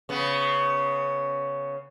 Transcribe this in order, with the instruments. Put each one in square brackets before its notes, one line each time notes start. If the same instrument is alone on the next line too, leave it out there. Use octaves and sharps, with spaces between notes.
[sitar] C#3 B3